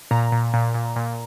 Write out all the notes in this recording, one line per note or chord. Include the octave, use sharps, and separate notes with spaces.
A#2 A#5
A#2
A#2
A#2
A#2